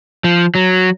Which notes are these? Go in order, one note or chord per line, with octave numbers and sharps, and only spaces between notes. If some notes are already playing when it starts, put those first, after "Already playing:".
F3
F#3